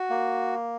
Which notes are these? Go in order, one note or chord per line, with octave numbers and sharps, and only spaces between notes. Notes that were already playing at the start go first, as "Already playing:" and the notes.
Already playing: F#4
A#3